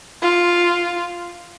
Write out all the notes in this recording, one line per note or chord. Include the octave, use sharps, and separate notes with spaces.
F4